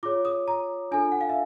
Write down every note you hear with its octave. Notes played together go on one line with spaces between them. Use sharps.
F4 G#4 C#5 D6
D#6
A#5
D4 F4 A4 G#5
F#5
F5
E5